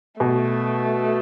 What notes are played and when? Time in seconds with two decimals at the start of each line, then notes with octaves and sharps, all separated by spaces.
0.20 B2 A3